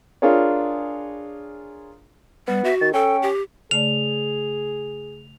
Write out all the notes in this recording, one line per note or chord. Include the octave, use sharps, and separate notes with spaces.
D4 F4 G#4 A#4 C#5
G3 B3
F#4 E5
D#3 A6
C#4 A4 G5
G4
C#3 A3 G#4 D5 F7